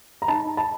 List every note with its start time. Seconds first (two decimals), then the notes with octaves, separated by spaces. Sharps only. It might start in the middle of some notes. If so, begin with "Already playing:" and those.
0.22 A#5
0.28 D#4 A5
0.57 A5